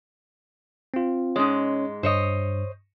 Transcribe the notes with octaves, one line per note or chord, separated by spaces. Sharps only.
C4 F4
G#2 G#3 C#4 C#5
G2 C5 C#5 D#5